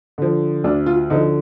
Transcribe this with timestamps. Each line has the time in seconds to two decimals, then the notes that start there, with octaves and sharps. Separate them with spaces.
0.18 D3 F3
0.64 D2 D4
0.86 F4
1.10 D3 F3 D#4